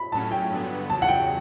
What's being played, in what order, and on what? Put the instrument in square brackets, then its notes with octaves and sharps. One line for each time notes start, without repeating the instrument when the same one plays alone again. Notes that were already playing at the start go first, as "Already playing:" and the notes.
Already playing: [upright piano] B5
[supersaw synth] A2 F#3 C#4 [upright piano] A5
[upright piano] G5
[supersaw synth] G2 D3 F#3 B3
[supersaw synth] E2 C#3 F#3 [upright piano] A5
[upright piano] F#5
G5